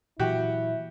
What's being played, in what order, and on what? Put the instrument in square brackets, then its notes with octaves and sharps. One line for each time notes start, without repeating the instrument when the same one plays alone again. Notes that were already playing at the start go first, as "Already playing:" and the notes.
[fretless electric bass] A#2 E3 F#3 [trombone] E4 [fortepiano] F#4 G4